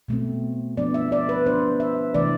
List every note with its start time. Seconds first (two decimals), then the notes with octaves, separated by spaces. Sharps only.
0.08 B2 A3 C4
0.77 F3 B3 D4 D5
0.94 E5
1.12 D5
1.29 B4
1.46 F3 B3 D4 C5
1.80 E5
2.15 C3 E3 A3 D4 D5